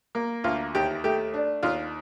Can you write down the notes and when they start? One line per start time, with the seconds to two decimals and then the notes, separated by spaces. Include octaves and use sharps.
0.15 A#3
0.44 D2 F4
0.75 D#2 G4
1.04 A3 G4
1.34 D4
1.63 D#2 F4